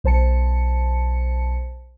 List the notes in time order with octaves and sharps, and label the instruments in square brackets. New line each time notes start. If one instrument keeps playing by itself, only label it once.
[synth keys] B1 C5 A5 C#7